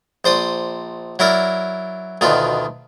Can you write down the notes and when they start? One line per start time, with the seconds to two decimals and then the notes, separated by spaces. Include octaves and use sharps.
0.25 A#1 C5 D5 D#6
1.19 F#3 E4 A#4 D5
2.21 D2 B2 D#3 F4 D5